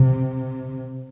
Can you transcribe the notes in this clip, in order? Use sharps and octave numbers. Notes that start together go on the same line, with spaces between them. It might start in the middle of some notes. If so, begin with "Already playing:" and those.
Already playing: C3